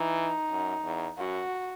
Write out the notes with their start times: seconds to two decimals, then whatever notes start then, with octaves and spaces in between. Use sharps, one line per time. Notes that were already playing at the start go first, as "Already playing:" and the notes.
Already playing: E3 D#4
0.51 F#2
0.84 E2
1.17 F#2 F#4